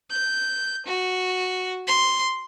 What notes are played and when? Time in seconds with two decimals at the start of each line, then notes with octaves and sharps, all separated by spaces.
0.11 G6
0.86 F#4
1.87 C6